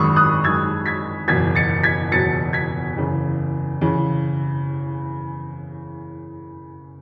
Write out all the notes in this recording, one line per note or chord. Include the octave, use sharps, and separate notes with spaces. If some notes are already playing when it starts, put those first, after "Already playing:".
Already playing: G#1 F#2 D#3 G#3 B5 C#6 D#6 E6
D#6 F#6
G#1 F#2 D#3 G#3 E6 G#6
G#6 B6
F#1 E2 B2 F#3 G#6 B6
A6 C#7
G#6 B6
F#1 E2 B2 F#3 A6 C#7
G#6 B6
F#1 E2 C#3 E3
C#3 E3